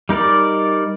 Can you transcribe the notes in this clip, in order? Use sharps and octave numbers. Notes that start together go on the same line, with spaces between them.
G3 D#4 A#4 D5